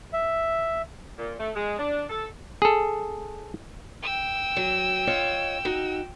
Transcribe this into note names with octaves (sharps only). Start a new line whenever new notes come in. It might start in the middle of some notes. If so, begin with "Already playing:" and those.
E5
A#2
A3
G#3
D4
A4
G#4 A4
G5 E6
F#3
F4 C#5 D#5
D#4 F#4